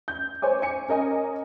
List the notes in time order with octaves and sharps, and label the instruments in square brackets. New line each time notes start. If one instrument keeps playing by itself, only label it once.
[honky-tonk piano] G6
C5 C#5 G#5 D6
G#5 C#7
C#4 A#4 D#5 G#5